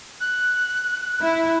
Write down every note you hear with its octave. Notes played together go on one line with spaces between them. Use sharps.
F#6
E4